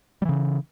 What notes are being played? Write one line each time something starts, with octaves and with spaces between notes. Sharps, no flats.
C#3 E3 G3